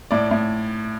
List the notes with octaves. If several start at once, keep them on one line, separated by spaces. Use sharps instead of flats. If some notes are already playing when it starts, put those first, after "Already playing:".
A2 D5
A2